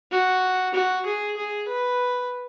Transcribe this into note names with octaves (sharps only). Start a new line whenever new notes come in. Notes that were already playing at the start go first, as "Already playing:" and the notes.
F#4
F#4
G#4
G#4
B4